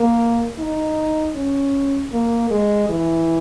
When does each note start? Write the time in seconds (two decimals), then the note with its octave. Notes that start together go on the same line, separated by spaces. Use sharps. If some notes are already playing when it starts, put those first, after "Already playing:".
Already playing: A#3
0.59 D#4
1.35 C#4
2.12 A#3
2.50 G#3
2.89 E3